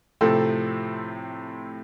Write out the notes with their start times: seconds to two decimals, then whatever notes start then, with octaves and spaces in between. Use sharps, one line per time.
0.21 A2 C3 F3 C4 A4